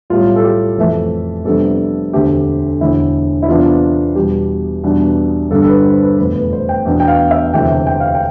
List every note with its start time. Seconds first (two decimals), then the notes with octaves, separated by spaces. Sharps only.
0.10 B1 A2 G3 F4
0.36 A4
0.44 G4
0.77 F1 F2 E3 A3
1.45 F2 C3 G3 B3 D4 A4
2.12 E1 D2 D3 A3 C4 G4
2.81 E1 D2 D3 E4
3.42 E4
3.48 E2 C3 E3 B3 D4 F4
4.15 E2 B2 G3 G4
4.83 E2 B2 G3 D4
5.50 G1 G2 D3 A4
5.62 A4
5.68 B4
5.85 C5
6.02 B4
6.18 F1 E2 B2 B4
6.35 B4
6.53 C5
6.69 G5
6.85 E2 B2 B3 D4
7.00 G5
7.08 F5
7.31 E5
7.53 E1 D2 C3 E3 G5
7.87 G5
8.00 F5
8.15 G5